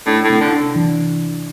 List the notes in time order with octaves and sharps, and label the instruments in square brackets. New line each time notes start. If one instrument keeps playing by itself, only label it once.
[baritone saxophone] A2 [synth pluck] D4
[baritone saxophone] A2
[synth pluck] C3
[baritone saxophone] D3
[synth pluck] D4
E3